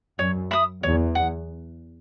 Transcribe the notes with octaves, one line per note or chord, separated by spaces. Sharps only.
F#2 C#5
E5 B5 D#6
E2 C#5
F#5